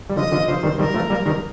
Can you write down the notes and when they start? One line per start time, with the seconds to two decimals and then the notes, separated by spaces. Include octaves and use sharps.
0.10 G3
0.16 D3 F3 D#5
0.32 D3 F3
0.47 D3 F3 C5
0.63 D#3 G3
0.78 D#3 G3 A#4
0.94 F3 A3
1.10 G3 A#3
1.26 D#3 G3